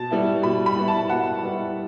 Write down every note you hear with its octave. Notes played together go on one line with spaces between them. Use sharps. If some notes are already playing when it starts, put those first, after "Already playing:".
Already playing: B2 A5
G3 B3 E4
B2 B5
B5
G3 B3 E4
A5
B2 F#5
G3 B3 E4